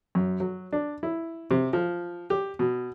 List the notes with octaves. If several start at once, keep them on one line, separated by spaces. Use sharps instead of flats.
F#2
F#3
D4
E4
C3
F3
G4
B2